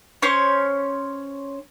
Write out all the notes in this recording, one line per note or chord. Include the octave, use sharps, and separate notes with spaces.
C#4 C5 C#5